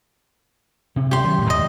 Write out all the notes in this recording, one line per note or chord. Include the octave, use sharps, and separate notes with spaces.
C3 C#4
G4 C6
D#3 F#3
D1 A2
D#2 G#2 D#5